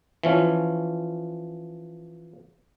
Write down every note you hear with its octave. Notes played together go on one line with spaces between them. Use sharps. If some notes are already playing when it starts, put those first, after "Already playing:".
E3 F3 C#4